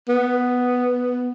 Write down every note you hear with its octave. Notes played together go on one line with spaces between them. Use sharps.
B3